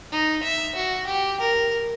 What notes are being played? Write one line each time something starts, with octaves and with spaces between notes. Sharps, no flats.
D#4
E5
F#4
G4
A#4